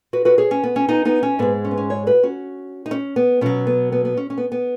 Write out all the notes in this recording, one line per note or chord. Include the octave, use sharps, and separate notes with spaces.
F#4 B4
F#4 B4
G#4 C#5
C#4
B3
C#4
B3 D#4
B3 D#4
C#4
G#2 G#3 B3
C#4
B3
C#4
G#4 C#5
F#4 B4
C#4 F#4
D#4
C#4
B3
B2 F#3 C#4
B3
B3
B3
C#4
C#4
B3
B3